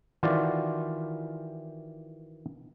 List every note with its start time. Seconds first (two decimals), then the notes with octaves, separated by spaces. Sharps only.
0.23 D#3 E3 F4 F#4 C5 D5